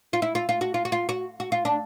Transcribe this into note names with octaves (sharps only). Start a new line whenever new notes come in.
F4
E4
F4
F4
F#4
F4
F#4
F4
F#4
F#4
F4
D4